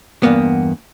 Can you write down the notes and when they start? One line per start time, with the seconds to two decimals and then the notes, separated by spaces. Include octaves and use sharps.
0.23 E2 G2 A#3 B3